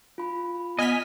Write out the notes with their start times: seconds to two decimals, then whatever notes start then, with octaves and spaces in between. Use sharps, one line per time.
0.18 F4 B5
0.79 B3 D#5 G#5 F6 B6